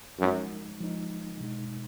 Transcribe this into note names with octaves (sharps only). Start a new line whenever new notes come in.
F#2 F3 G#3 D#4
F3 G#3 D#4
B2 G#3 D#4